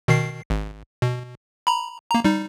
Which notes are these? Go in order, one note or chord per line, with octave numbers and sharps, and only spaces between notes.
B2 D#3 C7
G#1
B2
A#5 B5
A#3 A#5
G3 D#4